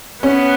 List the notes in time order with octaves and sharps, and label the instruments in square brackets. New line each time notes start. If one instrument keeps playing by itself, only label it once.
[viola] B3 [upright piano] C#4